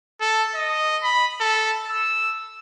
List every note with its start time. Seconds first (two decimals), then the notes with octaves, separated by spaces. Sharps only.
0.21 A4
0.55 D#5
1.03 B5
1.41 A4
1.90 E6